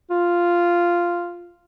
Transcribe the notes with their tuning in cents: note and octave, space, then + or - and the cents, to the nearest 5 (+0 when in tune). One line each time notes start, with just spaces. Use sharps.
F4 -5